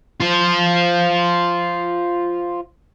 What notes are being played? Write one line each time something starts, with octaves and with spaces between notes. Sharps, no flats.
F4 C5